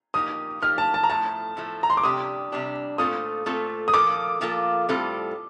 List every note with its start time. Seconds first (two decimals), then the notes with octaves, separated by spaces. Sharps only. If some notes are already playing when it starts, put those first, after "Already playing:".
0.14 A#2 F3 A#3 D#4 G4 D#6
0.62 A#2 F3 A#3 D#4 G4 F6
0.78 A5
0.94 A5
1.03 A#5
1.10 A2 F3 A3 A5
1.57 A2 F3 A3
1.83 A#5
1.90 C6
1.97 D6
2.04 C3 G3 D4 G4 D#6
2.52 C3 G3 D4 G4
2.98 A#2 A3 C4 F4 A4 D#6
3.46 A#2 A3 C4 F4 A4
3.88 D#6
3.93 A#2 F3 A#3 F4 A4 D6
4.41 A#2 F3 A#3 F4 A4
4.89 A2 G3 C4 F4 A4